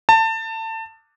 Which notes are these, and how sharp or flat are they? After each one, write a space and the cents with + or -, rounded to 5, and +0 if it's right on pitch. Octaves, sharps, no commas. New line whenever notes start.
A5 +25